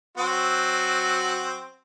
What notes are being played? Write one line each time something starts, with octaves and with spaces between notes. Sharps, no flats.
F#3 C4 F#4